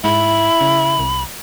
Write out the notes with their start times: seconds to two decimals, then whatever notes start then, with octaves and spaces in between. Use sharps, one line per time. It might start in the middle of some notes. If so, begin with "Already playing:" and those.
0.04 G#2 E4 B5
0.61 C#3
0.99 C2